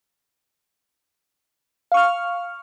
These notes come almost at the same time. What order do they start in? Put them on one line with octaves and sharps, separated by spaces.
F5 C#6 F6